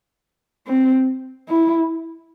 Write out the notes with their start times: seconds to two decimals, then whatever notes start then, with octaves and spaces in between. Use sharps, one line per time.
0.67 C4
1.48 E4